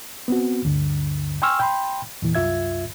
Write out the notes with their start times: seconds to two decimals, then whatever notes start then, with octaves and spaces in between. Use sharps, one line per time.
0.28 B3 C4 F#4
0.65 D2 G2 D3
1.42 G5 G#5 C6 C#6 E6 F6
1.59 G5 B5 C6
2.22 E2 A#2 E3
2.35 C2 F#2 F4 E5 G#6